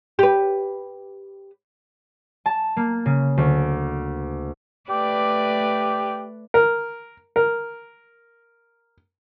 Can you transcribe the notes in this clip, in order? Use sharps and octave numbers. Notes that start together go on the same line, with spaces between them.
G4 B4
A5
A#3
C#3
D2
A3 G4 B4 D5
A#4
A#4